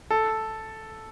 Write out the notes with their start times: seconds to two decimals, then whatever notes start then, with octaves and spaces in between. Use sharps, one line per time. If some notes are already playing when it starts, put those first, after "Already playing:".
0.10 A4